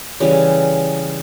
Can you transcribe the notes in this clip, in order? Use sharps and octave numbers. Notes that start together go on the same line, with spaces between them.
C#3 E3 G3